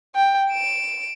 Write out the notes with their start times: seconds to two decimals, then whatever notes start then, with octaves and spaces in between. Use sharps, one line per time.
0.15 G5
0.50 D7 E7